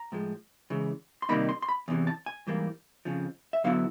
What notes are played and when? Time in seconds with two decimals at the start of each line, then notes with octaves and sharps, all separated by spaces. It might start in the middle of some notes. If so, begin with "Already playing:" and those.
Already playing: A#5
0.12 A2 F3 G#3
0.70 C#3 E3 G#3
1.22 C6
1.29 C3 D#3 G3 A#3 D#4 B5
1.49 C6
1.62 C6
1.68 B5
1.88 E2 C3 E3
2.07 A5
2.26 G#5
2.47 G#2 E3 G3 A#3
3.05 F2 C#3 F3
3.53 E5
3.64 D3 F#3 B3 E4 F5